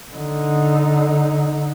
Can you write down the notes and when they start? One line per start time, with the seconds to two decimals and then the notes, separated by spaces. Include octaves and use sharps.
0.15 D3 D#4